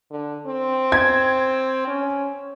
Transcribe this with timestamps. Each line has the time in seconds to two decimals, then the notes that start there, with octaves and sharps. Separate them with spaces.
0.11 D3
0.47 C4
0.92 G#6
1.87 C#4